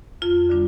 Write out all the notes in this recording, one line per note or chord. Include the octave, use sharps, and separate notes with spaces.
F2 F4
D3 G3 D4